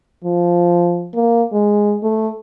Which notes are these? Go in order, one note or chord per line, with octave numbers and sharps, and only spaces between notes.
F3
A#3
G#3
A3